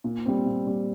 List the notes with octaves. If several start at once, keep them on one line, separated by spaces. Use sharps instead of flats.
A#2
G3 C4
A#2
G3 C4